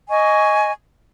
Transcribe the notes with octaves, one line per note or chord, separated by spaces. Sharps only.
D#5 G#5 C#6